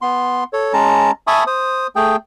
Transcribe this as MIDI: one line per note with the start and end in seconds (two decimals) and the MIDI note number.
0.02 0.44 59
0.02 0.44 84
0.53 0.73 69
0.53 0.73 73
0.73 1.11 56
0.73 1.11 61
0.73 1.11 81
0.73 1.11 82
1.27 1.44 76
1.27 1.44 80
1.27 1.44 81
1.27 1.44 83
1.27 1.44 85
1.27 1.44 87
1.47 1.87 72
1.47 1.87 87
1.96 2.16 57
1.96 2.16 68
1.96 2.16 79